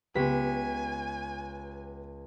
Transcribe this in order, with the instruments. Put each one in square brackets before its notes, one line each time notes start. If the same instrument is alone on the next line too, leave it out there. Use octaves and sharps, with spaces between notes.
[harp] C#2 B6 [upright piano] B3 G4 B4 [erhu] G#5